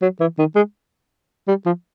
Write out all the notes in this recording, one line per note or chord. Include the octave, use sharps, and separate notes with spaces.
F#3
E3
D#3
G#3
G3
F3